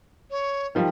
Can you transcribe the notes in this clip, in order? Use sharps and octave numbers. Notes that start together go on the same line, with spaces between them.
C#5
D#3 F3 G3